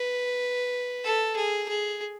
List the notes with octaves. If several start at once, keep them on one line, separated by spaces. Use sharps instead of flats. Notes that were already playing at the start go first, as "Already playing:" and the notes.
Already playing: B4
A4
G#4
G#4